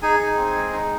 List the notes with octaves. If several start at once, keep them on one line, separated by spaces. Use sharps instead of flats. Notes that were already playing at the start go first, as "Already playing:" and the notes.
D#4 G#4 G#5
D#4
C4
G#3
D#4